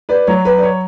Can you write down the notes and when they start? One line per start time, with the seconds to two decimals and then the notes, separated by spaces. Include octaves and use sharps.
0.09 B4 D5
0.27 F#3 C#5
0.45 B4
0.58 D5
0.63 C#5